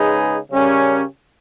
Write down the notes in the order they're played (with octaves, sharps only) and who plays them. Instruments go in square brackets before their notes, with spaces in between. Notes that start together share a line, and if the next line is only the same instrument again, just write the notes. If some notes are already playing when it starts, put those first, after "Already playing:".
Already playing: [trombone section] C#3 G#3 D#4 G#4 B4
C#3 G3 C#4 G4 A#4